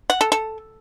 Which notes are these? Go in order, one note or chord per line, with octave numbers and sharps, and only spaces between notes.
F#5
A4
A4